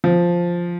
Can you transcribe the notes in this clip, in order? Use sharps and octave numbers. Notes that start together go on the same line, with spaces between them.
F3